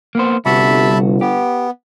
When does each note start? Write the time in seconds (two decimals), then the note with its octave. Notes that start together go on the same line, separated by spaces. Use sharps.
0.15 A#3 B3 C5
0.46 G1 C2 F#4 E5 A5 B5
1.21 B3 G4